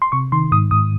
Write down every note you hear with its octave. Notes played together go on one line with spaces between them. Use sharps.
C6
C3 C#6
D#3 C6
G#2 D#6
G#2 D#6